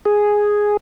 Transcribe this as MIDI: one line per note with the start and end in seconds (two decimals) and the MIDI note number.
0.05 0.77 68